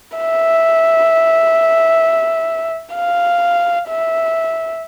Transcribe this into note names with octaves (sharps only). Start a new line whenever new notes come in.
E5
F5
E5